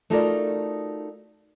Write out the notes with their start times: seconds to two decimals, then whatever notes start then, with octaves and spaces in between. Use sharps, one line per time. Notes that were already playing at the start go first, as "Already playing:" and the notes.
0.10 A3 D#4 F4 F#4 A#4 D5